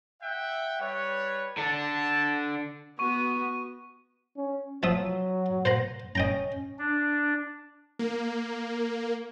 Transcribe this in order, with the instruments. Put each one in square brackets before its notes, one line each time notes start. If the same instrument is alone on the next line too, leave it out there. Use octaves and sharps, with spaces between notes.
[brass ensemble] E5 F#5 G5
G3 B4 C#5
[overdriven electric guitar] D3 D4 [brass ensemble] A5
[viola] B3 F#4 [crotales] C#6 D#7
[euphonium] C#4
[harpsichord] F3 E5 D#6 [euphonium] F#3
[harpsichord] C5 F#5 A#5
[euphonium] C#4 [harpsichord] D#5 G5 A#5
[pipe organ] D4
[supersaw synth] A#3